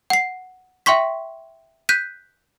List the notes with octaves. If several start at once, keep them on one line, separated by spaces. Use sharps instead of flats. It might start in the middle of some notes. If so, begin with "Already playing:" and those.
F#5 C7
E5 G5 C6 C#6 B6
F#6 G6 B6 D#7